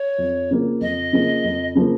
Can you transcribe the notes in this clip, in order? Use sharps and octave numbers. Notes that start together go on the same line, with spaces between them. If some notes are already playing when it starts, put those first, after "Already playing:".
Already playing: C#5
F2
C#3 F3 A#3
F2 D#5
C#3 F3 A#3
F2
C#3 F3 A#3